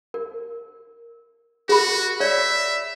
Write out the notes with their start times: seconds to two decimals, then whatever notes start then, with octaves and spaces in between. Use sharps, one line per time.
0.14 A#4
1.69 F#4 G#4 A#4 B5
2.20 C#5 D5 E5